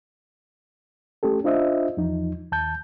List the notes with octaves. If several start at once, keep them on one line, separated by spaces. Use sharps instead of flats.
A3 C#4 G4 A4
D4 F4 C5 D#5 E5
E2 F3 D#4
D#2 A5 G6